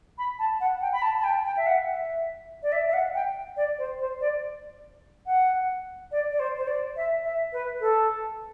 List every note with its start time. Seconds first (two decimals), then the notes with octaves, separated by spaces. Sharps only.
0.18 B5
0.39 A5
0.60 F#5
0.81 G5
0.93 B5
1.02 A5
1.19 A5
1.24 G5
1.45 G5
1.57 E5
1.66 F#5
1.87 E5
2.63 D5
2.72 E5
2.88 E5
2.93 F#5
3.15 G5
3.57 D5
3.78 C5
4.00 C5
4.21 D5
5.26 F#5
6.12 D5
6.30 D5
6.40 C5
6.57 C5
6.67 D5
6.96 E5
7.24 E5
7.53 B4
7.80 A4